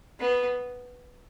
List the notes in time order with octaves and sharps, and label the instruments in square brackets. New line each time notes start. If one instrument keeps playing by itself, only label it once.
[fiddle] B3